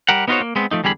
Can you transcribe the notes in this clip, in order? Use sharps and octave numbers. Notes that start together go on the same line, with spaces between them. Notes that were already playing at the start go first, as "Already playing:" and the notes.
G3 G4 A#4 F#5
B3 D#4 F4 F#4 C5 C#5
A#3
G#3 B3 C4
F3 A3 D#4
E2 D3 G3 G#4 G5 B5